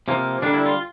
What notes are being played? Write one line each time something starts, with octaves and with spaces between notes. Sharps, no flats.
C3 F3 A#3
D3 G3 A#3 D4
E4
F4